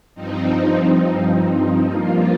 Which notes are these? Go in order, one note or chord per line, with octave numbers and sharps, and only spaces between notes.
G2 F3 C4 D#4
G2 F3 A#3 F4